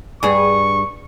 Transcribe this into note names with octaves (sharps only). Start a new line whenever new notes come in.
G2 G#4 C#6